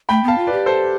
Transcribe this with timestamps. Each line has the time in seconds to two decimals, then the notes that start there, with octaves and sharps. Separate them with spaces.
0.09 A3 G5 B5
0.24 B3 F5 A5
0.38 F4
0.47 B4 D5
0.52 G4
0.66 A4 C5